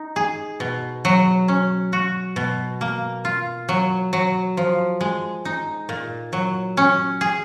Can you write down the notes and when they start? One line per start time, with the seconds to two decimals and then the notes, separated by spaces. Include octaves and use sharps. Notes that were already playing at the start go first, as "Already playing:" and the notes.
Already playing: D#4
0.16 G#4
0.60 B2
1.05 F#3
1.48 C#4
1.93 F#4
2.36 B2
2.81 A#3
3.25 F4
3.69 F#3
4.13 F#3
4.57 F3
5.01 G#3
5.45 D#4
5.89 A#2
6.33 F#3
6.77 C#4
7.21 G#4